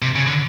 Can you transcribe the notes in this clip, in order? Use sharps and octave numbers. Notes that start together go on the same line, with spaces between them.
C3
C#3
D3